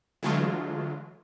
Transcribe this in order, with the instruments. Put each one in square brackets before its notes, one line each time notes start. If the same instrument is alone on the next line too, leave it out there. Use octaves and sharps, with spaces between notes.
[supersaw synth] D3 E3 F#3 G#3 A3 F4